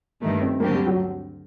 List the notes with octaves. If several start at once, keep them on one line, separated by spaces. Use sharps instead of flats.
G2 D#3 A3 A#3
C4
D2 D3 F#3 A#3 C4 G4
G3
F#3